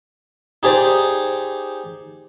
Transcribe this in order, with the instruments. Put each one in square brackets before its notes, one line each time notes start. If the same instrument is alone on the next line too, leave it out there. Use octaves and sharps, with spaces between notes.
[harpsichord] D#4 G4 G#4 C5 D5